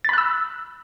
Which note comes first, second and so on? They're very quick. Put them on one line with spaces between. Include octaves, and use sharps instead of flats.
A6 B5 F#6 E6